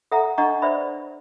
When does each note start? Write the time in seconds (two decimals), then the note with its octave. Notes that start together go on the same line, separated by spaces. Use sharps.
0.12 A4 E5 F#5 A#5
0.38 D4 D#5 F#5 A#5 C#6
0.62 B4 C5 D5 E5 B5